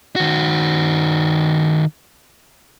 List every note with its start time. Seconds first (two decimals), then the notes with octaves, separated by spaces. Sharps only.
0.16 D#3 F#4